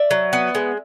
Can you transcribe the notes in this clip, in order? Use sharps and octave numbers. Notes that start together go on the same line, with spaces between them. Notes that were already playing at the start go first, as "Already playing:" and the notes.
Already playing: D5 E5
F#3
B3
G#3